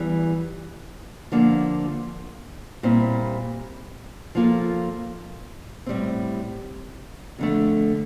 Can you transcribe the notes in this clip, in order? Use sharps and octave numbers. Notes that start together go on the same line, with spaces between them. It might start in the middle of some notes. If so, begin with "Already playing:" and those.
Already playing: E2 E3 G3
D3 F3 A#3
A#2 G3 C4 E4
F3 A#3 F4 A4
A2 G3 C4
F2 D3 A3